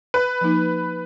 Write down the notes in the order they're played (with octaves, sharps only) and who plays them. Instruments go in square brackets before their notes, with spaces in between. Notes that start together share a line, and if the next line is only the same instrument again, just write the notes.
[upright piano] B4
[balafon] F3 A#3 D#4